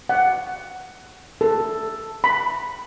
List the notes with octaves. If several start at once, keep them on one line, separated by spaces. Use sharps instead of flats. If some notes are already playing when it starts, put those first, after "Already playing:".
F#5
A4
B5